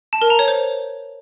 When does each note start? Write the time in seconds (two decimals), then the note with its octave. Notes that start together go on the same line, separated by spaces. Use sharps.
0.13 A5
0.22 A#4
0.30 A#5
0.39 C#5
0.48 C5